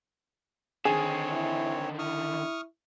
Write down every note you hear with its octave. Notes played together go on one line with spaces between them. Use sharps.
D3 D#3 C4 G#4 C#5
E4
E4 C#6 D#6 F6